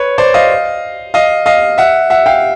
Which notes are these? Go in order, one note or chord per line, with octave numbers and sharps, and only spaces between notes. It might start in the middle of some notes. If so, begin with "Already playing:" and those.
Already playing: B4 C#5
C5 D5
D#5 F5
D#5 F5
D#5 F5
E5 F#5
E5 F#5
F5 G5